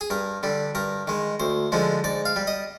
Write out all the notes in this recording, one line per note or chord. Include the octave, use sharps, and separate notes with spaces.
G#4
G2 A#4
D3 G3
G2 A#4
D#3 G#3
D2 C5
D3 F3 G#3
G#2 D5
F5
G3
D#5